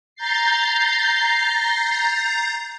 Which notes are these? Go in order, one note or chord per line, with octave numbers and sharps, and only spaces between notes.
A#5 G6 A6 C7